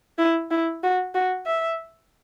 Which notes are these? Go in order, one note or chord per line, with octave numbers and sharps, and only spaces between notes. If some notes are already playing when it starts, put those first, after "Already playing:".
E4
E4
F#4
F#4
E5